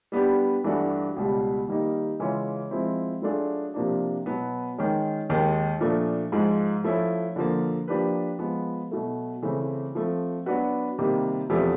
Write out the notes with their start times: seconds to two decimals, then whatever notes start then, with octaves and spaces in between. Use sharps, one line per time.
0.12 G3 B3 D4 G4
0.64 G2 E3 A3 D4 F#4
1.16 C#2 B2 G3
1.68 D#3 G3 A#3 D#4
2.19 C#3 E3 G#3 C#4 F4
2.71 F3 G#3 C4 E4
3.22 F#3 A3 D4 F4 G#4
3.74 C3 F3 A#3 D4
4.26 B2 F#3 B3
4.78 D#3 G#3 C#4
5.29 D#2 D#3 G#3
5.81 A#2 F3 A3 D4
6.32 G#2 F3 G#3
6.84 F3 A3 C#4 E4
7.36 D3 F3 A#3
7.88 F3 A#3 D4 G4 B4
8.39 F3 G#3 B3
8.91 B2 F#3 A3
9.42 C#3 E3 A3 C4
9.95 F3 A3 C4
10.46 F#3 B3 D4 F#4 B4
10.98 C3 D#3 G3 A#3
11.50 E2 C3 F3 A3